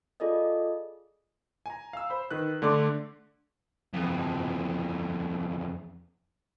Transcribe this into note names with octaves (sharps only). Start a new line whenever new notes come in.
F4 G#4 A4 D5 D#5
G#5 A#5
F5 E6
C5 B5
D#3 B4 F#6
D3 A3 D5 A5 C6 D6
F2 E3